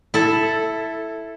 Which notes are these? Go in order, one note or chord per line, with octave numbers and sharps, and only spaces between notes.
E4 A4